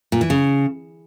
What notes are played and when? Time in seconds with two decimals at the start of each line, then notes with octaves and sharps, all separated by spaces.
0.12 A#2
0.21 E3
0.30 C#3